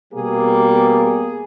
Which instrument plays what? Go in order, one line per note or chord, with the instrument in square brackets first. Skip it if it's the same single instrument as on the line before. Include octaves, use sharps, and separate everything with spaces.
[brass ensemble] B2 G3 A#3 G#4
G#4